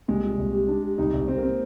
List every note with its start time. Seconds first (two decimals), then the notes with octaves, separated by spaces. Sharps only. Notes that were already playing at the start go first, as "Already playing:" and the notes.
0.08 C2 G#3
0.24 A#2
0.38 C2
0.53 G4
0.68 D4
0.83 G4
0.98 C2 D#4
1.14 C2
1.28 C2 C4
1.38 A#3
1.43 C4